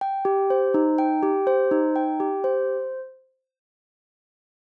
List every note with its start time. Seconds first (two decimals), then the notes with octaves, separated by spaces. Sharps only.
0.01 G5
0.25 G4
0.50 C5
0.74 D#4
0.98 G5
1.23 G4
1.47 C5
1.71 D#4
1.96 G5
2.20 G4
2.44 C5